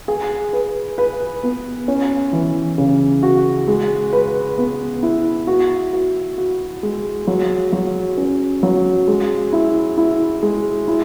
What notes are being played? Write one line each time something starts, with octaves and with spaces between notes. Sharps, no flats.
G#4
B4
B4
B3
C#4
E3
C#3
F#4
G#3
B4
B3
E4
F#4
F#4
F#4
G#3
F#3
F#3
C#4
F#3
G#3
E4
E4
G#3
E4